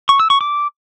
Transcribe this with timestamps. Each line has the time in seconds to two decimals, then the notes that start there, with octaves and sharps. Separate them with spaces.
0.09 C#6
0.20 E6
0.30 C#6
0.41 D6